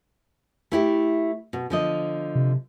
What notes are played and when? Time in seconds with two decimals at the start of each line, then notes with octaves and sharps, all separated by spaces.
0.72 A3 E4 G4
1.53 B2
1.70 D3 F3 D#5
2.35 C3